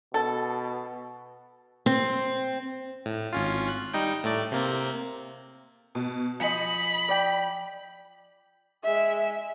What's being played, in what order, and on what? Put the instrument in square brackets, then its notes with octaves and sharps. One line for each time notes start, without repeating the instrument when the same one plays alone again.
[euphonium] B2 [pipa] A4
[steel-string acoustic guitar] C4
[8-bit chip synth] A2
G#1 C#4 F4
F#6
G3 D#4 G5
A2 A3 D5
C3 A#3 C4
[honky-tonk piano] B2
[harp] F3 [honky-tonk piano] D#5 G#5 C#7 [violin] B5
[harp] D5 G5
[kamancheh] G#3 E5